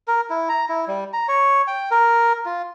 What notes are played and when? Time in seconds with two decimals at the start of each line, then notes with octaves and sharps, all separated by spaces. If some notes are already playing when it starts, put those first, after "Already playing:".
0.08 A#4
0.30 E4
0.49 A#5
0.69 E4
0.88 G3
1.13 A#5
1.28 C#5
1.67 G5
1.91 A#4
2.46 F4